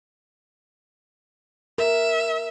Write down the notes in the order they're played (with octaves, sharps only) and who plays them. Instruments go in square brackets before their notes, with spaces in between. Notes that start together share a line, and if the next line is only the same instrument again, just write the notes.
[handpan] A#4 [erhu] E5